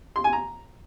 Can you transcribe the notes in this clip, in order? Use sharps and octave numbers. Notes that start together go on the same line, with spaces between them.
C6
G#5
A#5